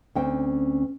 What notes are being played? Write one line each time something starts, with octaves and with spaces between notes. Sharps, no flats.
D2 C4 C#4 G5